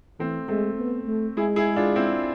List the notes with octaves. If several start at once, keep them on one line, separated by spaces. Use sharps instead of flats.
E3 A3 C4
G#3 A3 C4
B3
A3
G#3 E4 G#4
E4 G#4
D4 F4
C4 E4